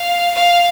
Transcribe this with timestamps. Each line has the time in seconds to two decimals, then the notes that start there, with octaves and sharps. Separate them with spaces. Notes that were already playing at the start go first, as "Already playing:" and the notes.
Already playing: F5
0.34 F5